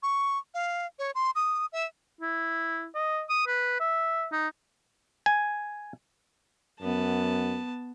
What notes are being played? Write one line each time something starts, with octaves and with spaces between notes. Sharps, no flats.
C#6
F5
C#5
C6
D#6
E5
E4
D#5
D#6
B4
E5
D#4
G#5
F#2 B3 A5